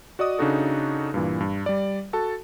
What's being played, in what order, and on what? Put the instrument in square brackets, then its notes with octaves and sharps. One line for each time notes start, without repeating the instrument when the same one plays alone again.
[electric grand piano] F#4 D5 D#5 D#6
C#3 D4 D#4 F#4 A4
G2 A#2 E3
G2
G3 D5
F#4 A4 A5